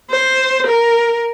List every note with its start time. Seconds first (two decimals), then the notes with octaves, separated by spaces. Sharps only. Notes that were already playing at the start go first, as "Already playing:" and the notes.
0.10 C5
0.66 A#4